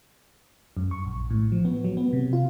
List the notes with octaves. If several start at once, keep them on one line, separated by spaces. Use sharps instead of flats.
F#2
C#6
A#1
A2
F3
B3
F#3
B3
C3
F4